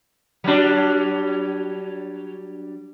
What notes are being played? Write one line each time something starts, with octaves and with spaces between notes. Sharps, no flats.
F#3 G3 D4